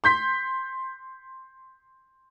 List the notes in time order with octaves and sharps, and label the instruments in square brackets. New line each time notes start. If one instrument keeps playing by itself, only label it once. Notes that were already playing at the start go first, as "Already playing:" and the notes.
[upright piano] C6 G6 B6